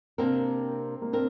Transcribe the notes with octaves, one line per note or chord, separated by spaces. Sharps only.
C3 A#3 C4 D4 A#4
A#3
C4 D4 A#4